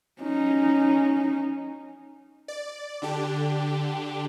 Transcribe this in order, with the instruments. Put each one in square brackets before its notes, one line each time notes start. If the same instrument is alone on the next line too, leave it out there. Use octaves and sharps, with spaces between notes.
[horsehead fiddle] C#4 D#4
[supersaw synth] D5
D3 D4 G4